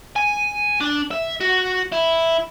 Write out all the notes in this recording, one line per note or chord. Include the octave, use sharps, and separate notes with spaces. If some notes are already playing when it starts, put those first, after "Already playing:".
G#5
D4
E5
F#4
E4